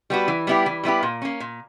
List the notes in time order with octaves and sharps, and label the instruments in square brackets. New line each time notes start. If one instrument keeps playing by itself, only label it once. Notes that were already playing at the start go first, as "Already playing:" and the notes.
[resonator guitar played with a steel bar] G3 B3 F#4
E3
G3 B3 E4 G4
E3
G3 B3 E4 G4
A#2
A#3 C#4
A#2